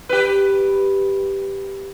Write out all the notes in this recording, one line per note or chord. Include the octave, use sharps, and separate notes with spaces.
G4 B4